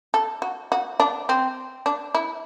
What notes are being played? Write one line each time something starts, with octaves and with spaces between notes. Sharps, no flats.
A4
F#4
F#4
D4
C4
D4
E4